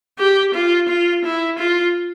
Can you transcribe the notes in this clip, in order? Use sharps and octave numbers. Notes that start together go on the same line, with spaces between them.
G4
F4
F4
E4
F4